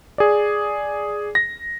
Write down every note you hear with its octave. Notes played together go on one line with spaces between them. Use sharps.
G#4 D5
A#6